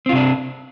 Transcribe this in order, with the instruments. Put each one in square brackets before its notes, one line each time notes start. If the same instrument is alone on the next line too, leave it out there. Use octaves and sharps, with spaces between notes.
[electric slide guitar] C4
F4
C3
D4